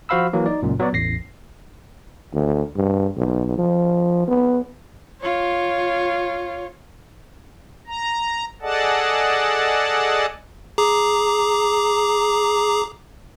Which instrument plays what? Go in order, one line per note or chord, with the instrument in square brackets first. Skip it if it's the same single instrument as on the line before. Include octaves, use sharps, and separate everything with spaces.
[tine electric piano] F3 F#4 C5 F5 B5 E6
E3 F#3 A#3
D#4 D5
C#2 F#2 A#2
F#3 B3 F#4 D5
A1 E2 A#6 C7
[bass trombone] D2
G2
B1
F3
B3
[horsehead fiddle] F4 C#5
[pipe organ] A#5
G#4 A4 D5 D#5 F#5 A5
[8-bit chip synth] G#4 A#5 D6